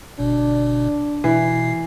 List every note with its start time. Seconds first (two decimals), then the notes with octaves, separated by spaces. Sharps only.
0.19 G1 B2 D4
1.24 B2 E3 C7